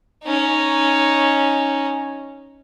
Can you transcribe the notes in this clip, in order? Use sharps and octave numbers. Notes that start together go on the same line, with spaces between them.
C#4 D#4